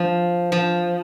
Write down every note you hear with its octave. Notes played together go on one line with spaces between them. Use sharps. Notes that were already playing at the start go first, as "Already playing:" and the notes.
Already playing: F3
F3